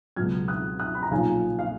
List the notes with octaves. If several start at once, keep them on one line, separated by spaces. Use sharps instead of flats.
C#2 B2 F#3 F6 G#6
D#6 F#6
D#6 F#6
B5
A#5
B1 A#2 F3 F5 G#5
F5